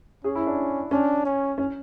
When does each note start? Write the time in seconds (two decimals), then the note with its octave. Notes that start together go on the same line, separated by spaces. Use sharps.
0.24 C#4 G#4
0.35 E4
0.47 D4
0.91 C#4 D4
1.25 C#4
1.58 C#4